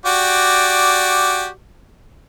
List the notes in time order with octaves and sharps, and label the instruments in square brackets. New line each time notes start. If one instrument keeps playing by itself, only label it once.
[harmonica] F#4 G4 D5